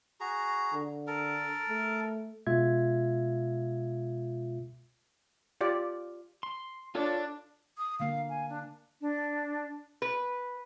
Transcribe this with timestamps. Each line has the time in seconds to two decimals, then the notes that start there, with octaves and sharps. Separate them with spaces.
0.20 F#4 G#4 A#5
0.74 D3
1.07 A4 A#4
1.68 A3
2.47 B2 G#3 F4 E5 G#6
5.61 F4 G4 D5
6.43 C6
6.95 D4 F4 A4 C#5
7.78 D#6
8.00 D3 A#3 F5
8.29 G#5
8.49 D4
9.01 D4
10.02 B4